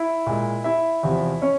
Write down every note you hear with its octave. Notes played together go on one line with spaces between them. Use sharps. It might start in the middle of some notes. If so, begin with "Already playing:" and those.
Already playing: E4 E5
A#2 G#3
E4 E5
E2 C3 F3
C#4 C#5